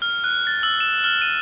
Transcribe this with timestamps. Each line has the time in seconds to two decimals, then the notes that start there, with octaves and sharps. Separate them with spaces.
0.02 F6
0.24 F#6
0.47 A6
0.63 E6
0.80 E7
1.04 F6
1.22 D#7